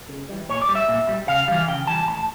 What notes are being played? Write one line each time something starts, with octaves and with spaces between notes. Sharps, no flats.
C#3
E3 G3
A#2 C#5
D5
G3
E5
A#2
G3
C#3 F5
E3 G3 F5
C#3 G5
E3 G3 A5
A2 A5